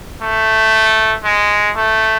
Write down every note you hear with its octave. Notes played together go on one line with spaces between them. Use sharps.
A3
G#3
A3